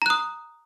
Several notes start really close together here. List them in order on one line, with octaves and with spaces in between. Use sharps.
A#5 F#6 D#6